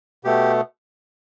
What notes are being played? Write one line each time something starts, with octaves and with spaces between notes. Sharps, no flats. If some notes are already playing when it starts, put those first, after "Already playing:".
B2 A3 G4